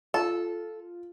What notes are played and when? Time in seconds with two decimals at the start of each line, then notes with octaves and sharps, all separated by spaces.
0.14 F4 A4